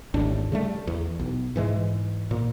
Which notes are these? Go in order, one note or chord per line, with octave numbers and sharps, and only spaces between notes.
G#1 D#2 A2 D4
C#3 G3 A3
E2
B1
G#2 E3 G#3
A#2